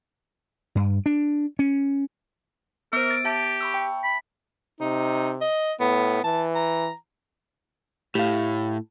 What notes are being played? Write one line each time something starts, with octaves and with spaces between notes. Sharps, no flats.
G2
D4
C#4
B3 A#4 C5 E6
A6 D7
G4 E5 A5
B5 C#6 E6
G5
B5
C3 D#4
D#5
A2 B3
E3 A5
A#5
A2 G4 F5